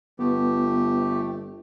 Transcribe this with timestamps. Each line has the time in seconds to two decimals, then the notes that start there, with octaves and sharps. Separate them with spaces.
0.19 G1 A3 B3 G4